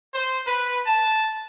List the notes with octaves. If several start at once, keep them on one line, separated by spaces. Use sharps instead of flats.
C5
B4
A5